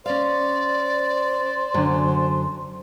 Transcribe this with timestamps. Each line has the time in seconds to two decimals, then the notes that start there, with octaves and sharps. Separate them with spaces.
0.06 C#4 C5 D5 F5
1.74 F#2 D3 F#3